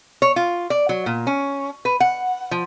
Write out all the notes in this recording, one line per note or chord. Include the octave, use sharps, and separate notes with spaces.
C#5
F4
D5
F#3
A#2
C#4
B4
F#5
F3